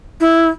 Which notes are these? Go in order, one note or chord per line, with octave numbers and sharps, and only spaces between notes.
E4